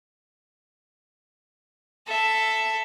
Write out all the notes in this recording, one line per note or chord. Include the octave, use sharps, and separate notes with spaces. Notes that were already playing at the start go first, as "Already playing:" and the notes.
A4 E5